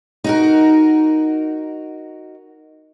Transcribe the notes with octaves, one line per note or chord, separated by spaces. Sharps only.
D#4 F#4 A#4